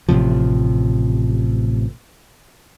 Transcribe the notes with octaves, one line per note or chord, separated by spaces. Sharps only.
A1 A2 C3 F3